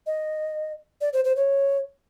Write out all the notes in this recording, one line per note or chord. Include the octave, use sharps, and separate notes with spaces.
D#5
D5
C5
C5
C#5